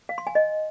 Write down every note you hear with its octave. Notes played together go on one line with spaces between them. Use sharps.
F5
C6
G#5
D#5